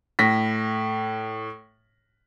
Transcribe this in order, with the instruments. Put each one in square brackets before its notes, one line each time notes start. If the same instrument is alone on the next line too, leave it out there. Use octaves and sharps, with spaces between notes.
[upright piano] A2 A#6 B6